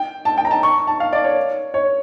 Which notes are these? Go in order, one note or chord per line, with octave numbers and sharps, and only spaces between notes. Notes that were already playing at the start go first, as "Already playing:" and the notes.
Already playing: G5
A5
G5
A#5
A5
C#6
A5
F5
D5
C#5
C#5